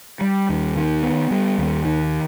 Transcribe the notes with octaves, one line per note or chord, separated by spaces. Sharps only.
G3
D#2
D#3
B3
G3
D#2
D#3